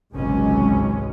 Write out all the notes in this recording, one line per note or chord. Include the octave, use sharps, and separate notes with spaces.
G#1 C#2 C3 F#3 G#3 C#4